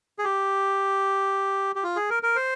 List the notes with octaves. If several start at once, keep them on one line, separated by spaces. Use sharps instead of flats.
G#4
G4
G4
F4
G#4
A#4
A#4
C5